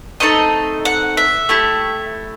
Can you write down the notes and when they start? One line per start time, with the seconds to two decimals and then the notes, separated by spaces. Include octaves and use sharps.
0.20 A3 C4 D#4 A4 D#5
0.85 F#5
1.17 E5
1.49 A3 E4 G4